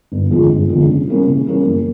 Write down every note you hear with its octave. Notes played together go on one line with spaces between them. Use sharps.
G1
F2 D3 F3 G#3
G1
F2 D3 F3 G#3
C#3
E3 G3 A#3 C#4
C#3
E3 G3 A#3 C#4
F#2